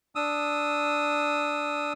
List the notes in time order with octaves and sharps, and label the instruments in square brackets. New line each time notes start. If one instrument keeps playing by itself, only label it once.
[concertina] D4 D#6 E6